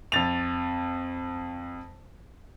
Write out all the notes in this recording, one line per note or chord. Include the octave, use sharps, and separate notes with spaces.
F2 A6 F7